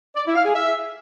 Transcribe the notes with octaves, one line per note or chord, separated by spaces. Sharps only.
D5
E4
F5
G#4
E5